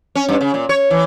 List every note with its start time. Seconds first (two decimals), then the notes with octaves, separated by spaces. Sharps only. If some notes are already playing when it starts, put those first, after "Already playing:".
0.15 C#4
0.28 G2
0.41 C#3
0.54 A#2
0.69 C#5
0.90 E3